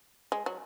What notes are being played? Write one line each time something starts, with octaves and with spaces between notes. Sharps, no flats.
G#3
F#3